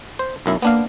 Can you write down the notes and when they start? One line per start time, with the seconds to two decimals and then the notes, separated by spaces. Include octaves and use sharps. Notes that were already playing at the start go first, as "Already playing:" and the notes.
0.19 C5
0.46 B1 F#2 E4
0.62 A#3 B3 D4 F5